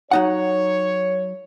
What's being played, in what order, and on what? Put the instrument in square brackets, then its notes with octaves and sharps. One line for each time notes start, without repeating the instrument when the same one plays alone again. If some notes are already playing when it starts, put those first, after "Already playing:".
[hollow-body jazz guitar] F#3 D#4 F#5 [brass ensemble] C#5